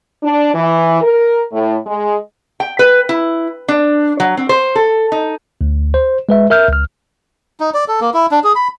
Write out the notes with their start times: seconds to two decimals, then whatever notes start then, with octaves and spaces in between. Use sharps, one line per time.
0.23 D4
0.55 E3
1.02 A#4
1.53 A2
1.87 G#3
2.60 G5
2.79 B4
3.09 E4
3.68 D4
4.20 F#3
4.37 C4
4.49 C5
4.75 A4
5.12 D#4
5.61 D2
5.94 C5
6.29 G#3 B4 E5
6.50 A#4 E5 F6 G6
6.68 C#2 F6
7.60 D#4
7.74 D5
7.88 A4
8.01 A#3
8.14 E4
8.31 D4
8.44 G#4
8.55 B5